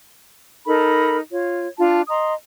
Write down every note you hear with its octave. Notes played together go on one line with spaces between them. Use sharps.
D#4 A4 A#4 B5
F4 C#5
D4 F4 A5
D#5 A#5 C6 D#6